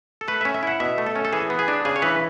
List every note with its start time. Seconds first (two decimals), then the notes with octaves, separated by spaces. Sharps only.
0.21 A4
0.28 A3 B4
0.41 C#4 E5
0.54 E5
0.63 E4 F#5
0.80 B2 E5
0.98 A3
1.07 A4
1.16 C#4
1.25 A4
1.33 E3 G#4
1.50 B3
1.59 G#4
1.68 D4
1.85 C#3 G#4
1.96 C#5
2.02 E3 B4